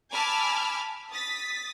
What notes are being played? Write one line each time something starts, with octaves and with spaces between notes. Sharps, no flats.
G#5 A5 B5 D6 E6 F6
D#6 A6 B6